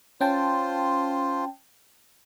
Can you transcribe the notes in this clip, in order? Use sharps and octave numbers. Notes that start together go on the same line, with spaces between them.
C#4 F4 C5 G5 A5